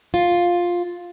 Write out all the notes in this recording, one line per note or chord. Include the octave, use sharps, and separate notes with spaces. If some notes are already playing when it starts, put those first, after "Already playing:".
F4